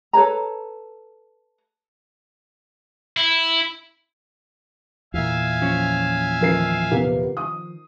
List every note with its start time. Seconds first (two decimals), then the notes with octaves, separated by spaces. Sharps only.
0.13 A4 B4 C#5 A#5
3.17 E4
5.14 E2 A#2 E5 F5 G#5
5.62 F3 C#4
6.41 A1 D#3 F3 A#4 C7
6.91 C3 A#3 B3
7.37 D#6